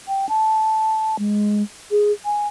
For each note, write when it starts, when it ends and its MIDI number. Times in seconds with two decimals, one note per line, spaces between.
0.08 0.29 79
0.29 1.16 81
1.19 1.63 56
1.91 2.12 68
2.25 2.48 80